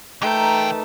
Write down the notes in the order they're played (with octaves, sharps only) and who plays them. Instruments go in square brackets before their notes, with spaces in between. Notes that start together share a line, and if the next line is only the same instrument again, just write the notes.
[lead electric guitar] E3 G5 [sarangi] A3 [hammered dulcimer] D#4 A#4 B4